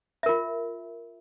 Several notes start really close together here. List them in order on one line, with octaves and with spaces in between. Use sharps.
E5 A#4 F4